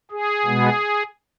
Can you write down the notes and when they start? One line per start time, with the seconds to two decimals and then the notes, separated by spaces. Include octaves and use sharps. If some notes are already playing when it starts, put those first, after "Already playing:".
0.11 G#4
0.45 B2 G#3 B3